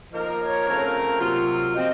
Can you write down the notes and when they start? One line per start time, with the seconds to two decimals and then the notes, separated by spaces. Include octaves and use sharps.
0.13 F3 A#3 D#4 A#4 D#5
0.40 C#5
0.67 C#3 A3 C4 F4 A#4
1.20 C3 F#3 A#3 F4
1.75 F3 C4 D#5